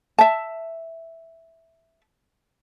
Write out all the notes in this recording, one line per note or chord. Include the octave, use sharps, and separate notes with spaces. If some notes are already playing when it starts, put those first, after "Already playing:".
E5 A5